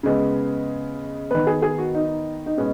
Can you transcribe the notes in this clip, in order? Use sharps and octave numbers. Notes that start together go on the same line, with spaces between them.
C#3 G#3 B3
D#3 B3 B4
G#4
G#4
F#4
D#4
D#4
B2 G#3 B3 C#4